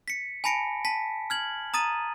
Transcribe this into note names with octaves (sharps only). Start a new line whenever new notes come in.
B6 C#7
G#5 A5 B5 A#6 C#7 D7
A5 B6
F6 G#6 F#7
A#5 D#6 A6 D#7